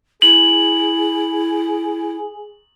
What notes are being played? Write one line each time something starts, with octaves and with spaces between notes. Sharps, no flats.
E4 G#4 F#7